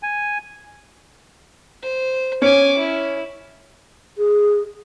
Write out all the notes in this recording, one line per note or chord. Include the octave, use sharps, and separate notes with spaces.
G#5
C5
C#4 G#5 D6
E4
G#4